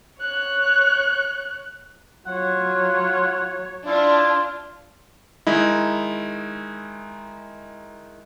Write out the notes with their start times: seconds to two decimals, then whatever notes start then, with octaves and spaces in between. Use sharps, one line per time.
0.20 C#5 F#6
2.27 F#3 F4 C#5 F#5
3.87 D4 E4 F4
5.47 D#3 G#3 D#4 E4